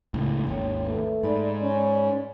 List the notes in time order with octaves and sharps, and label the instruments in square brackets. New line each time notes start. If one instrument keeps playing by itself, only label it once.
[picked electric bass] C#2 A2
[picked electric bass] G#1 D#2 [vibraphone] C#5 G5
[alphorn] A3 [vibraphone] B4
[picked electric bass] G#2 [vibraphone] D5 B5
[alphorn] C#4